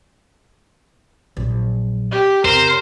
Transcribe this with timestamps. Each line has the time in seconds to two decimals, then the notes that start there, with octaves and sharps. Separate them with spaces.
1.37 A#1 F#3
2.12 G4
2.45 F2 C#3 A#4 C5